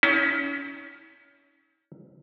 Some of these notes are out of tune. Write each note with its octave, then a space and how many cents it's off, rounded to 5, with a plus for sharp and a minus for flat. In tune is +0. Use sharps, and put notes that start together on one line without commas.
C#4 +30 E4 -45